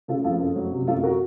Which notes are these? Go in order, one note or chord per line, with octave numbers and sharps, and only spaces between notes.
C#3 F4 A4
F2 F4 A4
F#1
F#3
C3
F#2 F4 A4
F#4 A#4